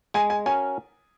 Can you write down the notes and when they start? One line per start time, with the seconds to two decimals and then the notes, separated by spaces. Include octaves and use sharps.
0.14 G#3 G#5
0.30 G#5
0.46 C#4 F#4 A#4 G#5